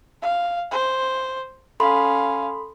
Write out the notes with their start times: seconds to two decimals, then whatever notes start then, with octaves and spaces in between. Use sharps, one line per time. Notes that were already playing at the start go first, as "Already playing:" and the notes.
0.22 F5
0.72 C5
1.80 C#4 A4 F5 B5 C6